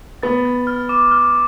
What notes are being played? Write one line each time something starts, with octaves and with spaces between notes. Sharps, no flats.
B3 A6
A6
F6
D6
F6